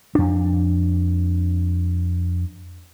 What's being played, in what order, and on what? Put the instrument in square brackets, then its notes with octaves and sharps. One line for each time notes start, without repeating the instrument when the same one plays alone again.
[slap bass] F2 D4